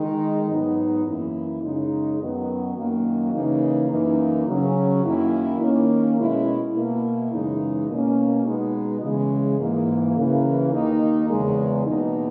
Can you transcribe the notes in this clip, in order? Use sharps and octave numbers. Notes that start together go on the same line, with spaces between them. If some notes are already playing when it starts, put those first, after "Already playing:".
Already playing: D#3 G#3 D#4
G#2 F#3 B3 D#4
F#2 E3 A#3 E4
F#2 C#3 G#3 D#4
F#2 D#3 F#3 B3
F#2 D#3 F#3 A#3
C#3 E3 A#3 D#4
F#2 E3 A#3 D#4
C#3 F#3 C#4
F#2 D#3 A#3 E4
D#3 A#3 C#4
B2 G#3 C#4 E4
B2 A#3 E4
F#2 C#3 E3 G#3 D#4
B2 A#3 C#4
B2 G#3 B3 D#4
C#3 E3 G#3
G#2 E3 A#3
C#3 E3 A#3
D#2 D#3 A#3 D#4
E2 C#3 G#3
E2 B2 A#3 D#4